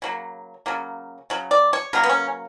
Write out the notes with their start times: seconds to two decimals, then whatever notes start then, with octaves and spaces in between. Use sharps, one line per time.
0.02 C#3 F#3 A#3
0.66 C#3 F#3 A#3
1.30 C#3 F#3
1.51 D5
1.73 C#5
1.93 C#3 F#3 A#3 A#4
2.03 B3
2.10 C#4